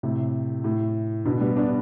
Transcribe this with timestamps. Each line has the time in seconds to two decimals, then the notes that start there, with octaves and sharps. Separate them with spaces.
0.03 A2 C3
0.64 A2
1.25 B2 D3
1.40 G3 B3
1.56 B3 D4